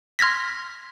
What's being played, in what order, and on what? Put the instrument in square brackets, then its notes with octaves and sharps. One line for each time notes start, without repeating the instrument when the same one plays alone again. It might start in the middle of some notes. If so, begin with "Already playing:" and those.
[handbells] C6 F6 G#6 A#6 B6